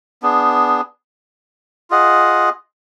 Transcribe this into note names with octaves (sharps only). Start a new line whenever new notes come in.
B3 D4 G#4
F4 G#4 D#5 F#5